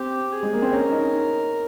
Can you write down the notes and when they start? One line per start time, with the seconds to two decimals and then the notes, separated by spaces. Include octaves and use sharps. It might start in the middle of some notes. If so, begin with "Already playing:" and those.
Already playing: C4 G4
0.32 G#4
0.43 G#3
0.53 A#3
0.62 C4
0.72 C#4 A#4
0.92 D#4